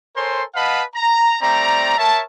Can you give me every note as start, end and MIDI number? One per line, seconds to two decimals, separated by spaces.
0.16 0.43 69
0.16 0.43 70
0.16 0.43 72
0.16 0.43 73
0.16 0.43 80
0.16 0.43 84
0.55 0.83 71
0.55 0.83 75
0.55 0.83 77
0.55 0.83 78
0.55 0.83 81
0.55 0.83 83
0.95 1.38 82
1.42 1.96 55
1.42 1.96 57
1.42 1.96 60
1.42 1.96 74
1.42 1.96 82
1.98 2.21 70
1.98 2.21 73
1.98 2.21 76
1.98 2.21 81